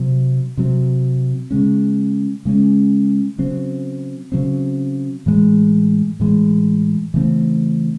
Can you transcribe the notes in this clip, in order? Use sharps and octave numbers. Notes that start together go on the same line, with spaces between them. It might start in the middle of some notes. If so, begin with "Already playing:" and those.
Already playing: C3 F#3 C4
C3 F#3 C4
C#3 G#3 C#4
C#3 G#3 C#4
C#3 F#3 C4
C#3 F#3 C4
A2 E3 G#3
A2 E3 G#3
C#3 E3 A3 C4